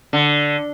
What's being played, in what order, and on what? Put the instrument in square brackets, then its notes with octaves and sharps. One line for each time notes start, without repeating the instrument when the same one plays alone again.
[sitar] D3